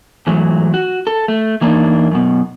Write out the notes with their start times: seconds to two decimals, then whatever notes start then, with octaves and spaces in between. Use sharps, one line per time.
0.27 G#2 E3 F#3 A3
0.74 F#4
1.07 A4
1.28 A3
1.61 E3 A#3 D4 D#4
2.11 F#2 B2